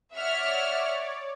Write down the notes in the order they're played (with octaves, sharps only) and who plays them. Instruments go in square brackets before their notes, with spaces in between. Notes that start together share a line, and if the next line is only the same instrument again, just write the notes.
[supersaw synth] C#5 D5 [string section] E5 F#5 F6